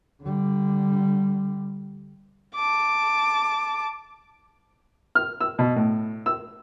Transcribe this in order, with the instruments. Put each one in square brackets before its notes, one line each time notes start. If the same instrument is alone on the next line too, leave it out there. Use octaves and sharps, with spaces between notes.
[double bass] D3 G3
[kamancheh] A5 D6
[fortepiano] F6
E6
B2
A2
E6